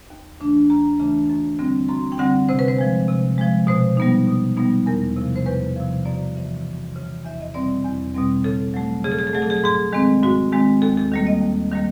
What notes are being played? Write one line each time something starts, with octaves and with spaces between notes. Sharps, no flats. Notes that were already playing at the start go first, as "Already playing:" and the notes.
D#2
C#3 E3 A3 D4
D#2 A#5
C#3 E3 A3 D4
F#2
D3 G3 C4
F#2 C6
G5
D3 G3 C4 F#5
C3 C5
B4
C5
F3 G#3
C3
F3 G#3
B2 C5
G3 B3 D#4
B2
G3 B3 D#4
E2 A#4
C3 F3
C5
E2 B4
C3 F3
F#2 D5
C#3 E3
F#2
C#3 E3
E2 E5
D#5
B2 G3 C4 D5
E2
B2 G3 C4
C#3 A4
F#3 A3
C#3 G#4
A4
G#4
A4
F#3 A3 G#4
A4
G#4
A4
G#2 G#4
D#3 G#3 C4
G#2 F#4
D#3 G#3 C4
D#2 A4
A4
D#3 G3 A#3
D#5
D#2
D#3 G3 A#3